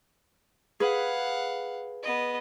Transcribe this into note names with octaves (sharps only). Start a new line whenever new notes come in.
G#4 B4 F5 F#5
B3 D#5